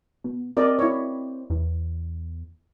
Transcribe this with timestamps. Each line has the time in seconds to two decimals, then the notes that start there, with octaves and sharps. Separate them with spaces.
0.24 B2
0.57 C4 A#4 D5 D#5
0.79 E4 C#5
1.50 E2